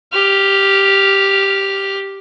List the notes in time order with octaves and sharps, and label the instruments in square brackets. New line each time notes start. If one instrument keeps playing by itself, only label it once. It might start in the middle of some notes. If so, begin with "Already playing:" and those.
[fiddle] G4 F6